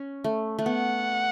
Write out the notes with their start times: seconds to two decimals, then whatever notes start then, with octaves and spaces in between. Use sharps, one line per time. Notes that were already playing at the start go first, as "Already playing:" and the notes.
Already playing: C#4
0.24 A3
0.59 A3
0.66 B3 F#5